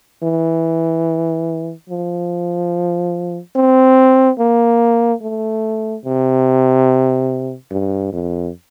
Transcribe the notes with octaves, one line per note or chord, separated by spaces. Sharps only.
E3
F3
C4
A#3
A3
C3
G2
F2